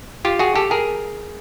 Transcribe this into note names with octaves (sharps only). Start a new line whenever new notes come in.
F4 G4
F#4 G#4
G4 A4
G#4 A#4